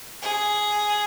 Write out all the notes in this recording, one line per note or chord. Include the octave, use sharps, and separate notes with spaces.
G#4